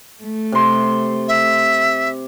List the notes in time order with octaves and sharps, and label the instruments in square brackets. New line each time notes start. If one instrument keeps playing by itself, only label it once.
[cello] A3
[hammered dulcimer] C3 C6
[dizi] E5